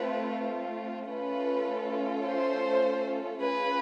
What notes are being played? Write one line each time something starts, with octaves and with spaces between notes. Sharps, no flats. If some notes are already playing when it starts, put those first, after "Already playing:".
Already playing: A3 C4 F4 B4
A3 C#4 F4 A4 B4
C5
C#4 F4 G#4 B4